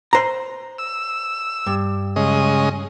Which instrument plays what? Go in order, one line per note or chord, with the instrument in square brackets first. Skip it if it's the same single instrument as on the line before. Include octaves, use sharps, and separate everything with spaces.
[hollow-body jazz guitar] C5 A#5
[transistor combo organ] E6
[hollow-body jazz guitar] G2
[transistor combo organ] C#3 G#3 D#5